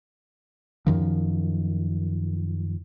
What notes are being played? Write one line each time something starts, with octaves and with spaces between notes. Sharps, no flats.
F#2 D#3 F3